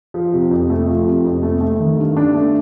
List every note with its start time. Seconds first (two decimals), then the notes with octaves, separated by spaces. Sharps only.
0.14 F3
0.33 C3
0.51 F2
0.70 A3
0.87 F3
1.06 C3
1.25 F2
1.43 A3
1.61 A3
1.80 D#3
1.97 G2
2.17 D4
2.34 A3